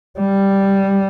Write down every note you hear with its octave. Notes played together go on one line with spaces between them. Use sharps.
G3